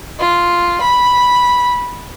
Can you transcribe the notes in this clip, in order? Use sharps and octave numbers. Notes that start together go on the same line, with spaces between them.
F4
B5